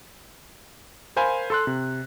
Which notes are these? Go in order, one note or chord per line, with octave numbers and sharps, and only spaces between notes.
A#4 C5 F5 G#5 B5
A4 C6 F#6
C3